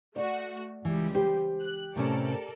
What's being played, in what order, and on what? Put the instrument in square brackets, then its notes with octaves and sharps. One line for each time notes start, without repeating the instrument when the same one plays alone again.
[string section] A3 F#4 [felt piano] D5
[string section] C#2 G3 [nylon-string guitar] E3
[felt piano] G4 [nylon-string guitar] C5
[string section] F#6
[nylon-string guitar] A2 C3 C#4 [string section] A4 A#4 D5